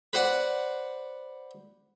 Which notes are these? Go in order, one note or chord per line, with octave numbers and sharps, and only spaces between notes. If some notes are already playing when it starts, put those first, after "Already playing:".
B4 C5 D5 F#5